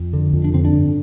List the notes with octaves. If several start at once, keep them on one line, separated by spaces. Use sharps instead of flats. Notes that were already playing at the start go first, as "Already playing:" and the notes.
Already playing: F2
D3
F2
D4
D3 C4
D4
G2